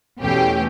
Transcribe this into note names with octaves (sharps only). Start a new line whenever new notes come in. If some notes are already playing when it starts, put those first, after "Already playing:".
E2 B2 A3 C#4 G4